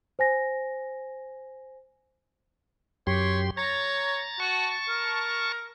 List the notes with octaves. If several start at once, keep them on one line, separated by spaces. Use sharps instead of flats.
C5 G#5 A#6
F#2 G4 C#5 C6
C#5 A#5 A6
F#4 A5 C#6
A#4